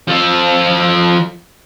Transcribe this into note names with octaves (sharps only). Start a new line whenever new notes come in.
F3 A4